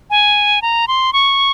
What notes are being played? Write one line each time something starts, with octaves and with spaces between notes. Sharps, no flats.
G#5
A#5
C6
C#6